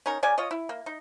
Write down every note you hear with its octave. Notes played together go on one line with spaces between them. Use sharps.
C#4 D#4 A#4
C#3 C#4 D5 G#5
F4 C#5 D#5
E4
A#3
D#4